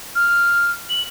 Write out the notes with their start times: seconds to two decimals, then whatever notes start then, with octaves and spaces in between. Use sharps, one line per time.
0.15 F6
0.89 F#7